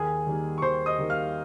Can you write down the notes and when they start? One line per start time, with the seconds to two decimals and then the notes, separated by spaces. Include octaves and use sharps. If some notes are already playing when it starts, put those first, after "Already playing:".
Already playing: D#2 G#4 G#5
0.27 D#3 G3 A#3
0.58 C#6
0.62 D#2 C5 C6
0.86 D#5 D#6
0.99 D#3 G3 A#3
1.10 F5 F6